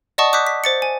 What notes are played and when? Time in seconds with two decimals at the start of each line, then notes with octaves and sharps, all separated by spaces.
0.18 D5 D#5 F#5 A5 C#6 D#6
0.33 D6 D#6 F#6 G6 B6
0.47 B6
0.64 C5 A6 C#7
0.82 G#5